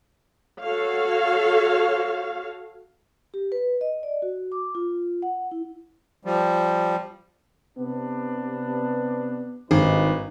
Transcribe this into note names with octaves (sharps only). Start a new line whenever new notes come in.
F#4 A4 C#5 F5
G4
B4
D#5
D5
F#4
D6
F4
F#5
E4
F3 G3
C3 B3 D4
G#1 G2 D#4 B4